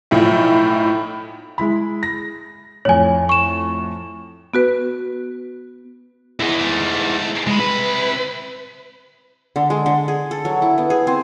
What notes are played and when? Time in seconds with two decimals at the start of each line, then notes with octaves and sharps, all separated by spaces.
0.11 B1 A2 F3
1.58 G#3 E4 B5
2.03 A#6
2.85 F2 A2 C#5 G#5
3.29 C#6 E7
4.54 B3 F#4 B4
6.40 E2 D#4 E4 G#4
6.60 G#2 A3
7.47 C3 G#3 B5
7.60 B4
9.56 D3
9.70 G#3
9.86 D3
10.08 G#4
10.31 A4
10.45 F#3
10.62 E4
10.78 B3
10.90 G#4
11.07 C4